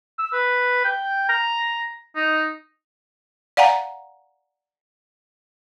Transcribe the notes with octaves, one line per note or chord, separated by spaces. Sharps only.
E6
B4
G5
A#5
D#4
D5 F5 F#5 G#5 A#5